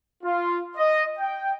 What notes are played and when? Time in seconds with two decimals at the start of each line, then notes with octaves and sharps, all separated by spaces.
0.24 F4
0.77 D#5
1.19 G5